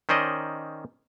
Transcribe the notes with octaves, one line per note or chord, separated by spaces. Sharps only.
D#3 C#4 C5 D5 D#5